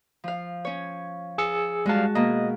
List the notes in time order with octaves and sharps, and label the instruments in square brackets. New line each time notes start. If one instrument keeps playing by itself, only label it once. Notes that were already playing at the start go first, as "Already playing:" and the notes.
[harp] F3 F5
C#4 C#5
[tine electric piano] G#4 E6 C#7
[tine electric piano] G3 F5 [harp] G#3 F#4 A5
[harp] B2 A#3 [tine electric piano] D#5